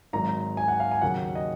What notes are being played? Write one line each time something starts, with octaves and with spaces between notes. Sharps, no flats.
G#1 G#2 F#3 A#5
G#5
F#5
F5
G#5
D#2 C#3 F#3 F#5
D#5